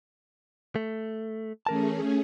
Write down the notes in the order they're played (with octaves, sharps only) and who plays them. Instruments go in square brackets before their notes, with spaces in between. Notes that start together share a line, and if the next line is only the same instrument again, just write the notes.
[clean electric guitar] A3
[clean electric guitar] E3 A#4 A5 [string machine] A3 C#4 G#4